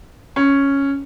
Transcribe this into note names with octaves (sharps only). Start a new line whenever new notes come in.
C#4